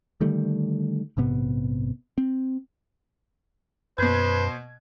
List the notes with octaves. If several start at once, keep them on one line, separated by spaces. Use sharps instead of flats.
D3 D#3 G3 A3
A#1 G#2 C3 B3
C4
F#2 B2 B4 C5 G#6